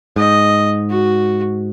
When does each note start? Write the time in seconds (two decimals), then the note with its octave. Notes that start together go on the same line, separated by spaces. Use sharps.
0.16 G#2 D#5
0.90 F#4